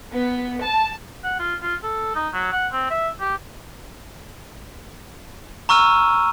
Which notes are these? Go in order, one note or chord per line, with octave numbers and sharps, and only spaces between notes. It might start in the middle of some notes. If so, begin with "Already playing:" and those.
B3
A5
F#5
F4
F4
A4
D#4
F#3
F#5
C4
E5
G4
A#5 C#6 E6 F6 D#7